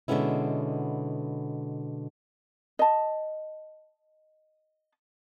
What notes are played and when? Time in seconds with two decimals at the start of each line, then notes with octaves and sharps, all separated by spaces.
0.08 B2 D3 G#3 B3 C#4 E4
2.79 D#5 A5